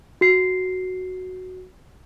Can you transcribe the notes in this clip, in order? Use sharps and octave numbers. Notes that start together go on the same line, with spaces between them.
F#4 C7